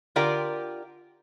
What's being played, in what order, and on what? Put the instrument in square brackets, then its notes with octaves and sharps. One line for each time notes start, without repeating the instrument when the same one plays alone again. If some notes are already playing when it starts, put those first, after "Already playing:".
[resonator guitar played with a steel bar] D3 F4 G4 A#4 D5